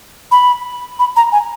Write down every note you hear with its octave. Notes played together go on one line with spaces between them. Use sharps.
B5
B5
A#5
G#5